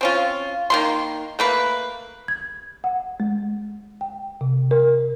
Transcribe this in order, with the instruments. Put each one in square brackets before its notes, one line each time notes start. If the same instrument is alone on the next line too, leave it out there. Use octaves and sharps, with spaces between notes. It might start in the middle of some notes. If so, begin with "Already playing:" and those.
[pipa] C4 C#4 F4
D#3 A#3 C6
A3 A#3 B4
[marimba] G#6
F#5
G#3
G5
C3
A#4